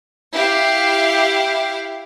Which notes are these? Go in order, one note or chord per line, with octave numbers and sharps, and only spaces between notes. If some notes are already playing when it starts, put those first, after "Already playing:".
E4 G4 F5